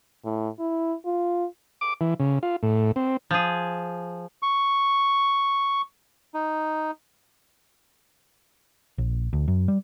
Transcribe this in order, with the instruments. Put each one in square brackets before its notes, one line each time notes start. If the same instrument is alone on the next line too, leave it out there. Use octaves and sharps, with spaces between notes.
[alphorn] A2
E4
F4
[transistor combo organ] D6
E3
C#3
F4
A2
C4
[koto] F3 G#4
[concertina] C#6
D#4
[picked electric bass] A#1
D2
F#2
G3